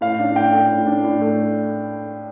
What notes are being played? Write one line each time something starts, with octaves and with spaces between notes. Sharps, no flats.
A2 F5
D4
A2 G5
A3
A2
D4
A2
A3